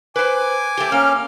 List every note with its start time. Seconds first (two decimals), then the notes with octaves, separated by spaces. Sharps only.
0.16 B4 C5 G#5 D6
0.77 A3 G4
0.92 A#3 C#4 F6